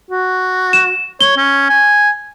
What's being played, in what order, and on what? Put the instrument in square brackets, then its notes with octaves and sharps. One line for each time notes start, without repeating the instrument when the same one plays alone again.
[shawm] F#4
[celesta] E7
[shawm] C#5 [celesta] G7
[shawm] C#4
G#5